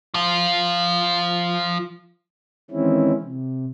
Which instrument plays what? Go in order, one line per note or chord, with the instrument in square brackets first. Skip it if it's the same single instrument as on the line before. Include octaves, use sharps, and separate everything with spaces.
[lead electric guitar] F3 F4
[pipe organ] D#3 E3 G#3 C4 C#4 E4
C3